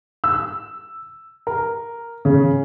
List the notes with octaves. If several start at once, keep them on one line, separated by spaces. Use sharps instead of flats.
E6
A#4
C#3